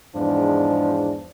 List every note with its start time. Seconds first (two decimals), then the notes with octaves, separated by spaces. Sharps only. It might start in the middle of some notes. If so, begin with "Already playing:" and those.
0.16 E2 G#2 F3 D4